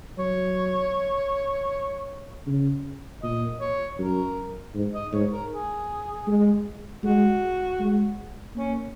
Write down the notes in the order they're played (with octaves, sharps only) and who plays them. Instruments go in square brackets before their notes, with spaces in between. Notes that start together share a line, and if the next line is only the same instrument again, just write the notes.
[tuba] F#3 [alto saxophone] C#5
[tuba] C#3
[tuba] A#2 [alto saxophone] D#5
[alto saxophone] C#5
[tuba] F#2 [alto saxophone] A#4
[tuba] G#2
[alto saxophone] D#5
[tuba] G#2 [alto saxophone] C#5
[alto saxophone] A#4
G#4
[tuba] G#3
[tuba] G#3 [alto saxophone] F#4
[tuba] G#3
[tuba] A#3 [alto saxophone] C#4